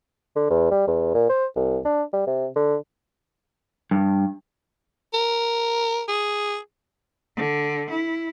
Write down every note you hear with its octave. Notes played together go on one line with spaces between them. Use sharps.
D3
E2
G3
E2
A#2
C5
C2
D4
G3
C3
D3
G2
A#4
G#4
D3
E4